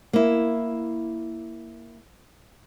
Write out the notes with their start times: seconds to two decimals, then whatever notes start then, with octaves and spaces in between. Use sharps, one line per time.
0.13 A#3 E4